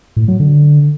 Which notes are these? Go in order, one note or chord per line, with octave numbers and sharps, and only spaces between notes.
A2
F#3
D3